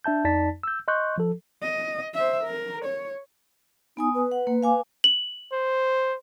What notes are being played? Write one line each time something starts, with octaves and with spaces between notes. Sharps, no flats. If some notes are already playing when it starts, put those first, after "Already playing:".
D4 E5 A5 G6
F2 D#4 D5 A5 A6 B6
E6 G6
D#5 C6 C#6 F#6 G6
F3 A4
D#5
C5 E5
A#4
C#5
B3 D#4 G#5 D#6
B4
F#5
A#3
F5 G#5 D6
F#7
C5